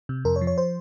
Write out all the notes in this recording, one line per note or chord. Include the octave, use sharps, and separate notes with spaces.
C3
F2 A#4
C#5
F3
C#5
C5